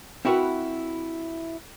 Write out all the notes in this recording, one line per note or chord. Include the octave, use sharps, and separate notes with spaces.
C4 E4 F#4 A#4 B4 F#5